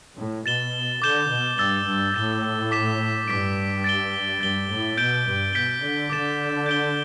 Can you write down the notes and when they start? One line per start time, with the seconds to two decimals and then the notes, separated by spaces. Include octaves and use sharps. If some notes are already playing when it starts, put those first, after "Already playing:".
0.16 A2
0.46 B2 A6 E7 G7
1.02 D3 D6 G6 E7 G7
1.30 B2
1.58 G2 E6 A6 G7
1.86 G2
2.14 A2 A6 E7 G7
2.71 D6 B6 E7
3.28 G2 D6 B6 D7
3.84 A6 D7 G7
4.41 G2 A6 G7
4.70 A2
4.97 B2 G6 D7 G7
5.26 G2
5.53 B2 G6 B6 D7 G7
5.81 D3
6.10 D3 D6 A6 E7
6.66 G6 D7 G7